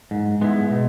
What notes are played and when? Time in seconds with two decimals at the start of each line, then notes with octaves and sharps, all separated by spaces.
0.11 G#2
0.41 G#3 B3 E4
0.71 B2